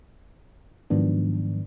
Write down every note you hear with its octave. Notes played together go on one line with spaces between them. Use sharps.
G#2 D#3 F3 F#3 B3 D4